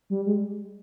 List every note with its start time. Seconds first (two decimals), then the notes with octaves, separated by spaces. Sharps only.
0.10 G3
0.26 G#3